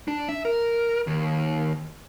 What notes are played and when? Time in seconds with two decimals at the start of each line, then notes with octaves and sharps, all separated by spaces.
0.08 D4
0.29 E5
0.45 A#4
1.07 D#2